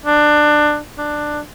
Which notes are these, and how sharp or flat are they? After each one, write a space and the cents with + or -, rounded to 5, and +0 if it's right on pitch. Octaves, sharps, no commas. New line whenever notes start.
D4 +20
D4 +15